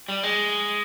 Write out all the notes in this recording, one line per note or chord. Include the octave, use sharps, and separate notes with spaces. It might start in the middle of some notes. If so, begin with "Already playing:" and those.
G3
G#3